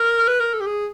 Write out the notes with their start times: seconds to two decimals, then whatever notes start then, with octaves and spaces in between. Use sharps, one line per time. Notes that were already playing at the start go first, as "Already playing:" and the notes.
Already playing: A#4
0.28 B4
0.40 A#4
0.53 A4
0.61 G4
0.66 G#4